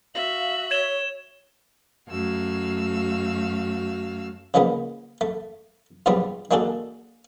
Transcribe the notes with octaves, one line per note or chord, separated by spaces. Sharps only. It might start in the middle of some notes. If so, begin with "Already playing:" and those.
F#4 E5 F5 F#7
C#5 G#6 E7 G7
F#2 A3 F#4 F5 E6
C#3 F3 G#3 A#3 B3
A3
G#2 C3 F3 G3 B3 D4
G#3 A#3 D4 F#4 G#4 A4